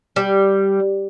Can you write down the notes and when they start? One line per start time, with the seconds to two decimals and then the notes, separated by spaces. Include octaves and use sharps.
0.16 G3